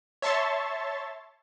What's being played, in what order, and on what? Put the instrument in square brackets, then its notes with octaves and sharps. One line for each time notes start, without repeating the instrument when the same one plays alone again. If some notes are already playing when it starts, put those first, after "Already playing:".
[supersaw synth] C#5 E5 A5 C6 C#6 A6